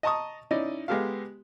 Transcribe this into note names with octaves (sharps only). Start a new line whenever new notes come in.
D#5 A5 A#5 C#6 D#6
C#4 D#4 E4 D5 D#5
G#3 B3 G4 A4 F5